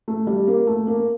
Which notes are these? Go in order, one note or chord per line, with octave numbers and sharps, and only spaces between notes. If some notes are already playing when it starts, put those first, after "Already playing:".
A3
G3
A#3
A3
A#3